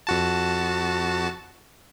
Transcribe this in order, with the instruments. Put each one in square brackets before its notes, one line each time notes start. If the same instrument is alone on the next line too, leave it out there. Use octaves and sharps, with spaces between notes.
[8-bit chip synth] F2 F#4 A5